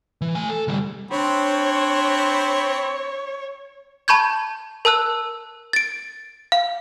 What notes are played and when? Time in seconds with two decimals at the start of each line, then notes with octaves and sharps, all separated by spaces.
0.21 E3
0.35 A3 G#5
0.49 A4
0.68 D2 G3
1.11 C4 D4 C5 C#5 B5
4.08 A5 B5 C#6 G6 G#6
4.85 A#4 A5 E6 F#6
5.73 A6 D7
6.52 F5